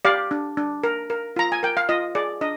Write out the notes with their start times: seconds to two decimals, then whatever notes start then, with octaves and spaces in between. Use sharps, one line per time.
0.05 G4 D5 F5
0.31 D4
0.57 D4
0.84 A#4
1.10 A#4
1.36 F4 A#5
1.52 G#5
1.63 A#4 G5
1.77 F5
1.89 F4 D#5
2.15 G#4 D5
2.41 D4 D#5